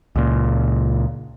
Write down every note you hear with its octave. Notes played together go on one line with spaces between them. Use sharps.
C#2 A#2